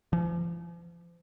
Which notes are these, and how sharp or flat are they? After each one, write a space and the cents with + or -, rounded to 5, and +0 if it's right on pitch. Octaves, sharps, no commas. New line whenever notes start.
F3 -40